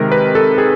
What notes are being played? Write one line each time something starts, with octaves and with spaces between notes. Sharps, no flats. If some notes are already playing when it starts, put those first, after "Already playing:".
Already playing: C3 D#3 G#3 A#4
B4
A4
G#4